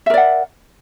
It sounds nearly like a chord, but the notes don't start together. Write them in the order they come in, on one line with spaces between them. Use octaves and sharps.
E5 A#4 D5 F#5